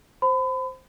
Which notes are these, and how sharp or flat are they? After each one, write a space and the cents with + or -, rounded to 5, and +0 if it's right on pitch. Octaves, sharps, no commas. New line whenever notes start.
C5 +0 B5 +35